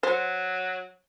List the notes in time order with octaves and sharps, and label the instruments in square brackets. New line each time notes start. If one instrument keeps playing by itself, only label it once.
[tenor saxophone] F#3 [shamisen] C5